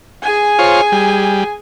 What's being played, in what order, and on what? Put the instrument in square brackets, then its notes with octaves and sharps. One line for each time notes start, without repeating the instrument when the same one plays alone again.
[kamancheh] G#4 G#5
[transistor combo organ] F4 C5 C#5
G3